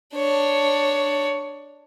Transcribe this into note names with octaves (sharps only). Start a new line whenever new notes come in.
D4 C#5